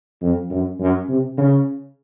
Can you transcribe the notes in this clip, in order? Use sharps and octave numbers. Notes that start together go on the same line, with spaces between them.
F2
F#2
F#2
C3
C#3